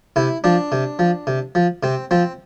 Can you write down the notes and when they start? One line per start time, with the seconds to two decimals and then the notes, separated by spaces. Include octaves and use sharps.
0.16 C3 E4
0.44 F3 D4
0.72 C3
0.99 F3
1.27 C3
1.55 F3
1.83 C3 C4
2.11 F3 C4